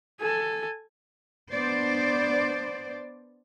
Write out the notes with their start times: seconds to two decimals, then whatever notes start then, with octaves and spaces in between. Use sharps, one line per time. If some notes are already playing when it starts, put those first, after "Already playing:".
0.21 A4 G#5
1.51 B3 D4 C5 D5